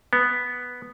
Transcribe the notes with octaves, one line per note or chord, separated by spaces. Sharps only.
B3